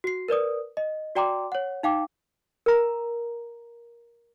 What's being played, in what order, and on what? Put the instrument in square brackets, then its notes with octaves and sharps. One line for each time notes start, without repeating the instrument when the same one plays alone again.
[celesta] F#4 C7
A#4 B4 D5 D#6
D#5
F#4 D5 G5 A#5 C6 D6
C#5 F#5
D#4 F5 G5 D6
[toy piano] A#4 A#5